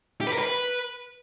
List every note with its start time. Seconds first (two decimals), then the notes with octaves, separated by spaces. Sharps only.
0.21 G4
0.27 B4
0.33 A#4
0.39 B4